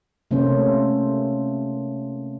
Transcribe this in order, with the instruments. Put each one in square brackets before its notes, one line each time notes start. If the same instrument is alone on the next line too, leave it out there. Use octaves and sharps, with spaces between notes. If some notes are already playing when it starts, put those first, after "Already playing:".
[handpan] C3 A3 A#3 C#4 C5